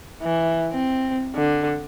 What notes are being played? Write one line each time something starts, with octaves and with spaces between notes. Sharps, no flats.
E3
C4
D3